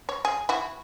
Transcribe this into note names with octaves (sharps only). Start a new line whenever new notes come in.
C#5
G#4
E4 F#4